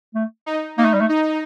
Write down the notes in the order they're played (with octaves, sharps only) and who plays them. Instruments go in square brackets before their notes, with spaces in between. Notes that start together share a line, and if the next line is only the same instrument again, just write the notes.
[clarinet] A3
[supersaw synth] D#4
[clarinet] A#3 [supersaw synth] D#4
[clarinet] A3
G3
A3
[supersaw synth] D#4